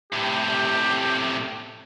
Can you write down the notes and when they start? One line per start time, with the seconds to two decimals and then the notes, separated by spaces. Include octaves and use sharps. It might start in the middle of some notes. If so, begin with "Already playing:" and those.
0.12 A2 C3 G4